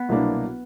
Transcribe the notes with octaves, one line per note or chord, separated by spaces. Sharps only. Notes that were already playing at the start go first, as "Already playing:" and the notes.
Already playing: B3
C2 B2 F#3 A#3 D4